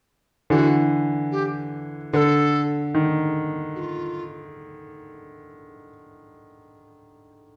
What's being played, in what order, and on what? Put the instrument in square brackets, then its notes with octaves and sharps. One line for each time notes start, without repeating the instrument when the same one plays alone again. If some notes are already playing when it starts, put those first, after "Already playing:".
[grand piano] D3 E3 [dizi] G4
[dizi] F#4
G4
[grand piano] D3 [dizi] A4 B4
[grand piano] D#3
[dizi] F#4
F4